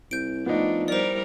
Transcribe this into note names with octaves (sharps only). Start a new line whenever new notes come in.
C2 G6 D7
F3 A3 B3 D4 D#4
G3 E4 A#4 C5 D5